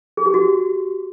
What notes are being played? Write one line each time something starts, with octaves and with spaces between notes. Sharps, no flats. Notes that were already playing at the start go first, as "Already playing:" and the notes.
G#4
G4
F#4